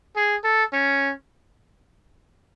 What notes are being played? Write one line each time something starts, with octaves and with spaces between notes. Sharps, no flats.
G#4
A4
C#4